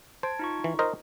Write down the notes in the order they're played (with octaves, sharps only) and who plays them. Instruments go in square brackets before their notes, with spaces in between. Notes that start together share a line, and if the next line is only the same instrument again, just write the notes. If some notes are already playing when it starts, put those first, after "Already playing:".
[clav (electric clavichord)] C5 [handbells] A5 G#6 D7
[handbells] D#4 F4 C#6
[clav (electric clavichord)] E3
A#4 C5 D#5